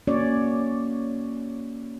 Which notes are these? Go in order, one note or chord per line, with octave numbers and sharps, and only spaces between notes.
A#3 C#4 F#4 C#5 D5